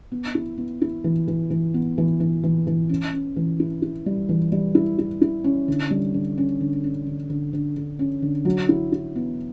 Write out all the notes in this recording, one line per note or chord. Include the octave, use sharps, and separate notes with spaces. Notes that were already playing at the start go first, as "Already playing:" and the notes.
B3
E4
B3
E4
E3
E3
E3
B3
E3
E3
E3
E3
C#4
C#4
E3
E4
E4
G3
E3
G3
E4
E4
E4
C#4
D3
G3
D3
C#4
D3
C#4
D3
D3
D3
D3
C#4
D3
F#3
E4
E4
B3